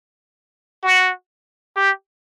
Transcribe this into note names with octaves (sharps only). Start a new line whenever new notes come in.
F#4
G4